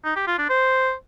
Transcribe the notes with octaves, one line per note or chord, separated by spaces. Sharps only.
D#4
G4
F4
D4
C5